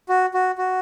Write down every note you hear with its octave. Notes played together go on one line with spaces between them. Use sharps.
F#4
F#4
F#4